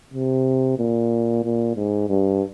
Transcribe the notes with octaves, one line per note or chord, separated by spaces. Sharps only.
C3
A#2
A#2
G#2
G2